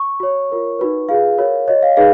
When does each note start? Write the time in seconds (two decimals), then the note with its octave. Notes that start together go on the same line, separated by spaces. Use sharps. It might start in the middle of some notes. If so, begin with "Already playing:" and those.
Already playing: C#6
0.20 F#4 C#5
0.49 F4 A#4 C#5
0.79 D#4 F#4 B4
1.09 F4 G#4 B4 F5
1.38 F#4 A#4 C#5
1.68 F#4 C#5 D#5
1.82 F5
1.97 D#4 G#4 B4 F5